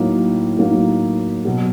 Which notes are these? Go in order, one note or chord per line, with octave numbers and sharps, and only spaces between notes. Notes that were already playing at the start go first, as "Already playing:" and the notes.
Already playing: A2 F#3 A#3 D#4
A2 F#3 A#3 D#4
B2 F#3